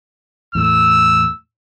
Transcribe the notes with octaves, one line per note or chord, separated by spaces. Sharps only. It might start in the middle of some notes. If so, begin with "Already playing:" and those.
E2 A2 E6